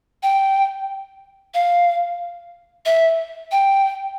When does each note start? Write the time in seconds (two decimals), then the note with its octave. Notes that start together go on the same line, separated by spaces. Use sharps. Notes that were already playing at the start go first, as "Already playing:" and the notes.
0.23 G5
1.54 F5
2.86 E5
3.52 G5